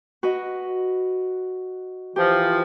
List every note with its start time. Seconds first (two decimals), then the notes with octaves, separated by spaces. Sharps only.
0.23 F#4 B4 D#5
2.16 E3 F3 G4